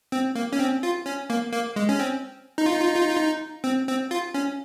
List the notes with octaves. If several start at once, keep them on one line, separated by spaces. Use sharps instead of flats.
C4
A#3
C#4
C4
F4
C#4
A#3
A#3
G#3
C#4
C4
D#4
F4
D#4
F4
D#4
F4
D#4
F4
D#4
C4
C4
F4
C#4